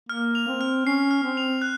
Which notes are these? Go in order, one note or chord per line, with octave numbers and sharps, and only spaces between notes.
A#3 F6
F7
C4
F6
C#4 C7
F6
C4
F7
F#6